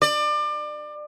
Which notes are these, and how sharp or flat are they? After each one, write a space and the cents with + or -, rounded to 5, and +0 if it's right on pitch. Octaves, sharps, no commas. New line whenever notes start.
D5 +30